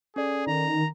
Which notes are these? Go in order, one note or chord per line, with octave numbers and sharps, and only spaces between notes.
C#4 G#4 A4 D5
D#3 A#5